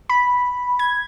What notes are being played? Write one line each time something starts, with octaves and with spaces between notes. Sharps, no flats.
B5
G#6